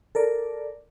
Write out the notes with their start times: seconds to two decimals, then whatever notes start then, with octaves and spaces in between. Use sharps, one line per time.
0.15 A4 A#4 D5